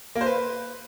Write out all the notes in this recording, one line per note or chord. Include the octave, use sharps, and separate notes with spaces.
A#3
C5
B4